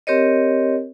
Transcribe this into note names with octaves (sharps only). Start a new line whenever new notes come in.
C4 G4 A#4 C#5 D#5